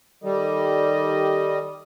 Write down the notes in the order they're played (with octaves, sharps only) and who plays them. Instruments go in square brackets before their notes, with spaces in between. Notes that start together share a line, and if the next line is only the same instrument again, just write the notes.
[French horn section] D#3 A4 [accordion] G3 [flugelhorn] D#5